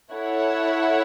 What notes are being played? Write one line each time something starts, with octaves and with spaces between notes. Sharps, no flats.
E4 A4 C#5 F#5